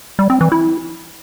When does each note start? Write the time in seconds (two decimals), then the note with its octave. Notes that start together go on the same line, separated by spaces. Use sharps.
0.19 G3
0.30 C4
0.41 E3
0.52 E4